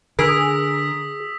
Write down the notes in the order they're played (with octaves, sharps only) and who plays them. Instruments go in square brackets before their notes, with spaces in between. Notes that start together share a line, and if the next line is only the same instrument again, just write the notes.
[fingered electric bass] D3 [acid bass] G#4 [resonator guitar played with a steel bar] A#4 [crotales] D#6 E6 B6